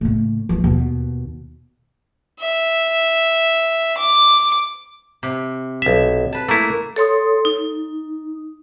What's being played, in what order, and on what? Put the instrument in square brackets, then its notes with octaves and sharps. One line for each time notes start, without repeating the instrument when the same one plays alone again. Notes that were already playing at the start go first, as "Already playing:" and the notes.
[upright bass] A2 C#3
G#2 E3
D#2 B2
[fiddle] E5
D6
[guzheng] C3
[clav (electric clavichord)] B1 E5
[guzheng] B4 A5
[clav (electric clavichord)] A3 E4 [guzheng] A#3
[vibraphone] A4 C#5 C6 D#6
D#4